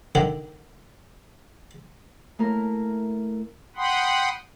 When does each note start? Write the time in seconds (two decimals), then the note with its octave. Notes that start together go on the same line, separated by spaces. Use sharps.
0.15 D3 D#3 D4
2.38 A3 A#3 E4 A#4
3.76 F#5 G5 B5 C6 D#6